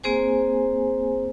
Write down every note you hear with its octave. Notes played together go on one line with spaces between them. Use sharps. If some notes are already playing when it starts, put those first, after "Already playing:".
A#3 C4 G#4 C5 G#5